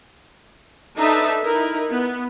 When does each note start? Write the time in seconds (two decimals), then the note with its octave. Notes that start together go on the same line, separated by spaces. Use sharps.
0.97 D4 D#4 A4 B4 E5 A5
1.41 D#4 E4 A#4
1.91 B3